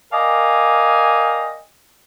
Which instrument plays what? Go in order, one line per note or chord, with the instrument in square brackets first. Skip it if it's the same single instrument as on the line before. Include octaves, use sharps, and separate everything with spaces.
[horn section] A#4 D5 D#5 F5 G5 G#5